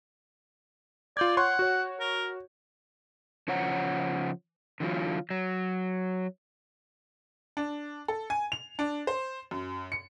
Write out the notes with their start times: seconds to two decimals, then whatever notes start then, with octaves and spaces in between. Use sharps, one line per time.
1.17 F4 D5 G6 G#6
1.37 C#5 F#5 C6 C#6
1.59 F#4 C#5
2.00 A#4
3.48 C#3 F3 C5 C#5 F#5 A#5
4.80 D3 E3 F#3 F4
5.30 F#3
7.57 D4
8.08 A4
8.30 G#5
8.52 F7
8.79 D4
9.07 C5
9.51 F#2
9.92 C#7